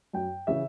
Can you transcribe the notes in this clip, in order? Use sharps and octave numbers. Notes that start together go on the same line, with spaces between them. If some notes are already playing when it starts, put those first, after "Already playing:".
F#2 G5
C#3 E3 E5